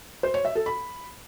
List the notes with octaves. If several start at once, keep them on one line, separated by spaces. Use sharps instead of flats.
C5
C#5
E5
A4
B5